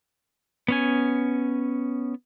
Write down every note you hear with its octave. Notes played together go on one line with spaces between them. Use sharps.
B3 C#4 G#5